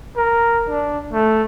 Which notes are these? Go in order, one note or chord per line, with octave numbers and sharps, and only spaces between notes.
A#4
D4
A3